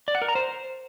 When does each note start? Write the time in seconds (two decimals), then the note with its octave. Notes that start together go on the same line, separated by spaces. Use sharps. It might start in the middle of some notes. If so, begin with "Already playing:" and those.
0.08 D5
0.15 F#5
0.22 A#4
0.28 A#5
0.35 C5